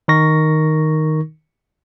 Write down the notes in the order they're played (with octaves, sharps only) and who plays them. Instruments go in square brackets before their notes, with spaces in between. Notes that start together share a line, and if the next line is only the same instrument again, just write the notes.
[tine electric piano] D#3 D#4 A#4 C#6 A#6